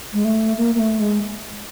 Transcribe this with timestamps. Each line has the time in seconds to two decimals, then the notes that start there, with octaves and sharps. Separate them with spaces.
0.14 G#3
0.25 A3
0.57 A#3
0.75 A#3
0.79 A3
1.00 G#3